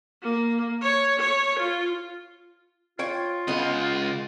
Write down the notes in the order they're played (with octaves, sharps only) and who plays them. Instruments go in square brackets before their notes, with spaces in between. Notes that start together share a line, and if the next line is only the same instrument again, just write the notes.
[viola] A#3
C#5
C#5
F4
[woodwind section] F4 [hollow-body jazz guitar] C#5 G5
[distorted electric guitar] C#3 D#5 [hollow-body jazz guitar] G#3 B3